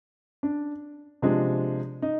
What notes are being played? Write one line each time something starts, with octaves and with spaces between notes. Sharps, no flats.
D4
C3 F3 G#3 D4
D#4